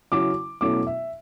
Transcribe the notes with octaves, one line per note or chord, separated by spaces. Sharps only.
C#3 F#3 C#4 E4 D6
B2 F#3 A3 C#4 E4 D6
E5